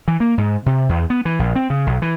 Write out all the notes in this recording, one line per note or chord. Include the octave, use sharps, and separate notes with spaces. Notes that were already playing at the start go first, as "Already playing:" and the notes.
E3
A#3
G#2
C3
E2
B3
E3
A#1
C4
C#3
B1
E3